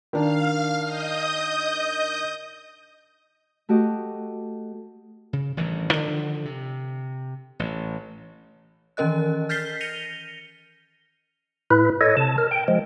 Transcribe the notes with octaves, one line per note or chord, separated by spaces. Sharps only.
D#3 D4 F5 F6
D#5 D#6 G6
A3 F#4 G4 D#5
C#3
A1 G2 D#3 E3
D3 D#3 F3
C3
A1
D#3 E3 C#4 A#4 D#5 F#6
F6 G6 A6 B6 C7 G7
A#6 C#7 D#7 F7 G7
A2 E4 B4
A4 C#5 D#5
C3 A5
A#4
G5
F3 G#3